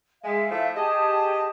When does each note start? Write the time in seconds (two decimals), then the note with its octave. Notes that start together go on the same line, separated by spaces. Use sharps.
0.23 G#3 E5 F5
0.50 F3 A3 E4
0.75 G4 G#4 D#5 A5